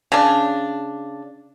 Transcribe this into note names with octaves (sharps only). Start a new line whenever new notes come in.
C#3 D4